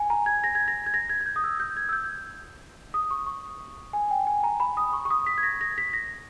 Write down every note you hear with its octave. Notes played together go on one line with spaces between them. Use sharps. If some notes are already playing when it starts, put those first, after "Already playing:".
Already playing: G#5
A#5
G#6
A#6
G#6
A#6
G#6
A#6
G#6
G#6
G6
D#6
E6
G6
G#6
E6
G6
D#6
C#6
C#6
G#5
G5
G#5
A#5
B5
D#6
C#6
C#6
D#6
B6
G#6
A#6
A#6
B6
A#6